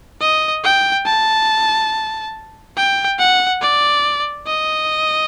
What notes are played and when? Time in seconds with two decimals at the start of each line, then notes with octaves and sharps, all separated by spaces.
0.20 D#5
0.64 G5
1.06 A5
2.77 G5
3.19 F#5
3.62 D5
4.47 D#5